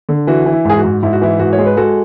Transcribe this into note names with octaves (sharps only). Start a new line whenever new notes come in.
D3
E3 F#4
E3
E4
G#2 G#4
F#4
G#2
G#2 E4
F#4
E3 E4
G#2 F#4
C#5
G#3
B4
G#3 F#4 A4